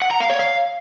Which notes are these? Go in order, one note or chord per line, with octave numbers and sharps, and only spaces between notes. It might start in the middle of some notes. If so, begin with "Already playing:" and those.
F#5
A#5
F5
C#5
F5